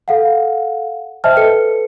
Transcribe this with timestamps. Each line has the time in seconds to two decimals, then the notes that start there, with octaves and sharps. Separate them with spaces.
0.08 A4 F5 F#5
1.24 C5 D#5 E5 G5 A5 F6
1.37 A4 B4 C#7